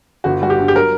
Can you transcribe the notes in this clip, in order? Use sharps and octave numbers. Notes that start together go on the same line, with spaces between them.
G1 F#4
G3 F#4
G4
G2
G4
F#3 A#4